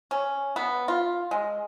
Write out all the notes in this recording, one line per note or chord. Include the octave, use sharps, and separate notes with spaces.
C#4
B3
F4
G#3